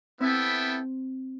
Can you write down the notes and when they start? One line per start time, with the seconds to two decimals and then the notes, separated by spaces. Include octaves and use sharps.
0.20 B3 C4 E4 A4 E5 G5